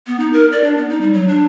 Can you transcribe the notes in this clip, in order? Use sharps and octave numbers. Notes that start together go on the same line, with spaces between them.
B3
D#4
A#4
D5
D4
B3
D#4
G3
F#3
D4